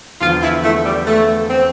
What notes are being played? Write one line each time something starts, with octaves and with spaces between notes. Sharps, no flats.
E2 D3 F3 F4
E4
A3
G3
A3
C4